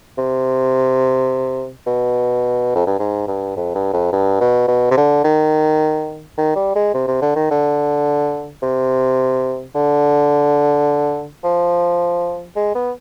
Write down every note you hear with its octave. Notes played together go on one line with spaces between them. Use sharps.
C3
B2
F2
G2
G#2
G2
F2
G2
F2
G2
B2
B2
C3
D3
D#3
D#3
G3
G#3
C3
C3
D3
D#3
D3
C3
D3
F3
G#3
B3